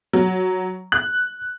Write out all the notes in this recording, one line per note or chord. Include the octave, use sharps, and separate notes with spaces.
F#3
F#6